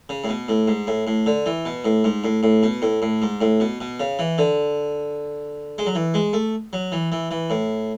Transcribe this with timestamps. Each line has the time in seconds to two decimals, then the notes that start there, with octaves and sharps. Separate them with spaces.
0.09 C#3
0.24 A2
0.29 B2
0.49 A2
0.68 G#2
0.87 A2
1.07 A2
1.26 D3
1.46 E3
1.65 B2
1.85 A2
2.04 G#2
2.24 A2
2.43 A2
2.63 B2
2.82 A2
3.02 A2
3.22 G#2
3.41 A2
3.60 B2
3.81 B2
4.00 C#3
4.19 E3
4.38 D3
5.78 G#3
5.86 F#3
5.95 E3
6.14 G#3
6.33 A3
6.73 F#3
6.92 E3
7.12 E3
7.31 E3
7.50 A2